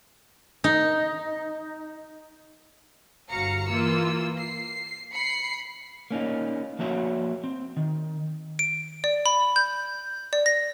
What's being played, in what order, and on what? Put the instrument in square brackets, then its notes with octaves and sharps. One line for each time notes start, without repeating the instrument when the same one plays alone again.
[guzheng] D#4
[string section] G1 F#4 F5 A#5 C#7
E3 A#3 F4 E6
C7
B5 C7 C#7
[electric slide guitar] A#3 C#4 D#4 F4
F3 A#3 F#4 C#5 E5
C4
D#3
[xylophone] D7
D5
B5
G6
D5
A#6